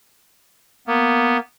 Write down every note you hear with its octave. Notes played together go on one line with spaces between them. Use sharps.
A#3 B3